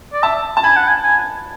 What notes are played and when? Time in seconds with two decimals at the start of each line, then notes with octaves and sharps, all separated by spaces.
0.13 D5
0.23 E5 A5
0.57 A5
0.63 G#5 B5
0.76 F#5
0.88 G#5
1.03 G#5